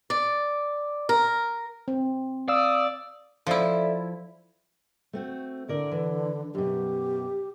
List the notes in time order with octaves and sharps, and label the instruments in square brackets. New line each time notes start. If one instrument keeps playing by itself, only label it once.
[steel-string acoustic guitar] D5
A#4
[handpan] C4
[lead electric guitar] D5 [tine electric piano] F5 E6 [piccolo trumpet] D#6
[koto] F3 E4 [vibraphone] A4 D5 E5
[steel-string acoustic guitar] A3 C4 F#4
[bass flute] D3 [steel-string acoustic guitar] E4 A#4 D5
[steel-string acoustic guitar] E3
[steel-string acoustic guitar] F#2 B2 [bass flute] G4